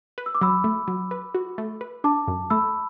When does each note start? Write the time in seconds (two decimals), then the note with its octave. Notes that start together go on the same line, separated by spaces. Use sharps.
0.18 B4
0.26 E6
0.35 D6
0.41 F#3 B5 E6
0.64 A3
0.88 F#3
1.11 B4
1.35 F#4
1.58 A3
1.81 B4
2.04 D4 A5 D6
2.28 F#2
2.50 A3 B5 E6